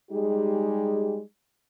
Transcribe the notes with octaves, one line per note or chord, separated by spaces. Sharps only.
G3 G#3 D#4 G4 G#4